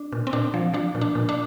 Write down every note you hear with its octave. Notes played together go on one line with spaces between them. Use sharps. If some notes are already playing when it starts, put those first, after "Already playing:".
Already playing: D4
A#2
C4
A#2 D4
F3
F3 D4
A#2
D4
A#2
D4